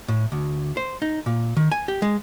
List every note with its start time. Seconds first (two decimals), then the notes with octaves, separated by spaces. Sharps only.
0.08 A2
0.32 D2
0.77 C5
1.02 D#4
1.26 A#2
1.57 D#3
1.72 G#5
1.88 G4
2.02 G#3